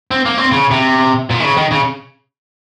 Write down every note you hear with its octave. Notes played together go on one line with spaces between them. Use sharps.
C4
A#3
C4
C#3
C3
A#2
D#3
C#3
D#3
C#3